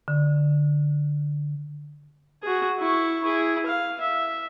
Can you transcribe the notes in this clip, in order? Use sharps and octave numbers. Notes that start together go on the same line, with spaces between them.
D3
F#4 G#4
E4 C#6
E4 G#4
F5
E5